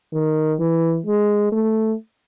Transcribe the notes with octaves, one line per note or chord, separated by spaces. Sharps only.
D#3
E3
G#3
A3